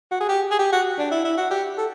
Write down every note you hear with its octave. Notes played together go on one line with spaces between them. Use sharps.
F#4
G#4
G4
G#4
G4
F#4
D4
E4
E4
F#4
G4
A4